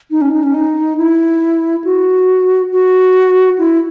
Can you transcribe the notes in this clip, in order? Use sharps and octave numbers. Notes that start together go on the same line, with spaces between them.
D#4
C#4
D#4
C#4
D#4
E4
F#4
F#4
E4